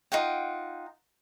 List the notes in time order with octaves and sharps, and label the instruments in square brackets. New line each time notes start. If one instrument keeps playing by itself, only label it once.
[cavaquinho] D#4 F4 F#5 G5